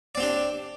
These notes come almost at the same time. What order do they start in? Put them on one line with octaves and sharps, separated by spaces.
D5 C4 G4 D4